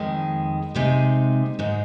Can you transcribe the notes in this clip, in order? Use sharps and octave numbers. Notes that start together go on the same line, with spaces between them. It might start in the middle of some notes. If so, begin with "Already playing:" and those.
Already playing: F2 D#3 G#3
C3 G#3 C4 D#4
G#2 G#3 D#4